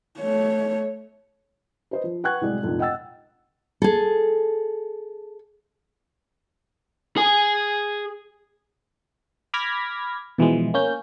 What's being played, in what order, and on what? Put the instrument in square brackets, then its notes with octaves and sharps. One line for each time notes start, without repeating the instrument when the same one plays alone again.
[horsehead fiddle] A3 C#5
[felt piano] B4 C5 D#5
F3
B4 F#5 G5 C#6 F#6 G#6
C2 A2 F#3 G#3 D5
F1 A#1 G#2 F3
D#5 F#5 G5 E6 A6
[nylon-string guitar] G#4 A4
[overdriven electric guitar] G#4 G#5
[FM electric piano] B5 D6 F6 G#6 A#6 B6
B2 E3 F3 G#3
A#3 C#4 G6